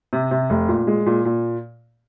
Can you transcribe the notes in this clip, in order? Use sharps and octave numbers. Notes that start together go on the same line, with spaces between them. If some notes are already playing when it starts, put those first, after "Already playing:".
C3
C3
F1
A#2
G#3
A#2
A#2